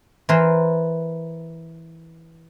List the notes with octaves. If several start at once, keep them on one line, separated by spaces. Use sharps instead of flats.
E3 A#4 C5